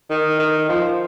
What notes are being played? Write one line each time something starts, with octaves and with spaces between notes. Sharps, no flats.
D#3
D#3
F3